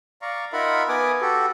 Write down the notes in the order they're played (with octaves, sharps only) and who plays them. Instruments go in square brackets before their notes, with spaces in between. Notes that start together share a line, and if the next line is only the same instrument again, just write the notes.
[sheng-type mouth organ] D5 F5 A#5 C#6
D#4 F4 A#4 E5 F#5 B5
B3 B4 G#5 D6 D#6
F#4 G4 A4